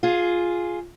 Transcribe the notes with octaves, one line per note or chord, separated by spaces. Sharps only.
F4 G#4